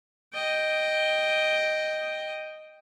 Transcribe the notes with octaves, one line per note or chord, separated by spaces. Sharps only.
D#5 G5